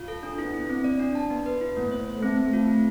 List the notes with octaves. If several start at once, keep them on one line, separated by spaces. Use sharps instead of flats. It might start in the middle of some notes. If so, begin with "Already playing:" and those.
Already playing: F4
A4
D4
B3 E4
E4
C4
D5
D4
A5
B3
B4
E4
A3 B3
C5
C5
A3 C4
C4
F4
C4